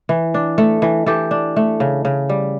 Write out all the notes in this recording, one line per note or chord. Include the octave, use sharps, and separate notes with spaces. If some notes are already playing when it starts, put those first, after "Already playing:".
E3
D4
A3
E3
E3 G4 A4
D4
A3
C#3
C#3
G3